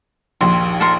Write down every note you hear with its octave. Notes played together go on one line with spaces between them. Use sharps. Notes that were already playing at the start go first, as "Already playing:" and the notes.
A#1 D#2 C6
A4 A#4 C6